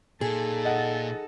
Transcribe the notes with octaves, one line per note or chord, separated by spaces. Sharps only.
A#2 D#4 G#4 A4
D#5 F#5